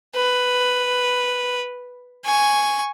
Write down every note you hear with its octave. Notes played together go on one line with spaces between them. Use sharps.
B4
G#5 C#6